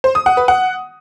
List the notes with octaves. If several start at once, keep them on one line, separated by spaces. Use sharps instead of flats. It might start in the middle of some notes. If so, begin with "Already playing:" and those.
C5
D#6
F#5
B4
F#5